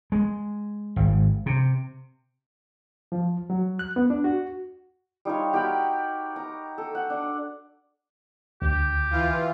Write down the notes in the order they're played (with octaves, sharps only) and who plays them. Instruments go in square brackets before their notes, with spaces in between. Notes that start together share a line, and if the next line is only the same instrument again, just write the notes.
[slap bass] G#3
G#1
C3
[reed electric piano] F3
F#3
F#6
B3
D4
F#4
[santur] G3 D#4 F4 C#5
F#4 G4 A#4 B5
A#5
A4
F#5
D4
[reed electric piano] D2 [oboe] G4
[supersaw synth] E3 F4